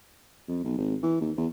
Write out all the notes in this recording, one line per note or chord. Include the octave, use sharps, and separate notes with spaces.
F2
B1
G#1
E3
D#2
E2